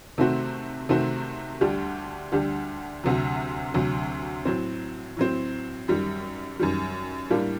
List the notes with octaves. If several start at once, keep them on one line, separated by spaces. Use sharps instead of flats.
C3 D#3 A3 C4 F#4
C3 D#3 A3 C4 F#4
D2 D3 G3 D4 G4
D2 D3 G3 D4 G4
D2 C3 F#3
D2 C3 F#3
A2 F#3 C4
A2 F#3 C4
F#2 D#3 G3
F#2 D#3 G3
A2 G3 A#3 D4